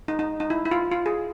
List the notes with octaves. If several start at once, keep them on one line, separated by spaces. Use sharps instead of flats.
D#4
D#4
D#4
E4
E4
F4
F4
G#4